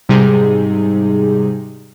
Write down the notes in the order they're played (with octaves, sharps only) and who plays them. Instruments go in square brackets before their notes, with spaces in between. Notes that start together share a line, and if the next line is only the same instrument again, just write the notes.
[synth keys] G#2 C3 G3 D#4 G#4